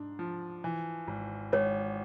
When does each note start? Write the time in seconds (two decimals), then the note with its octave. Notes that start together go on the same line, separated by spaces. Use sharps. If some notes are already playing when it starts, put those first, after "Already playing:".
Already playing: G#2 D4
0.19 F3
0.64 E3
1.07 G#1
1.52 G#1 C#5